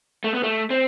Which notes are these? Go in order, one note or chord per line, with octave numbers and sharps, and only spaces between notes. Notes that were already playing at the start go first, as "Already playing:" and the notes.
A3
B3
A3
C4